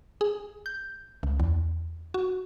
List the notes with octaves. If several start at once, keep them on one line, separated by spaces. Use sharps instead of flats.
G#4
G6
C#2
E2
F#4